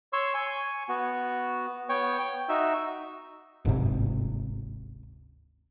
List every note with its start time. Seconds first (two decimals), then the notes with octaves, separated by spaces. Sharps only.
0.13 C#5 C6 C#6 E6
0.34 G#5 C#6
0.89 B3 F#4
1.89 B3 C#5 G5 C#6
2.20 G5
2.49 D#4 F#4 E5
3.65 D1 G1 G#2 C3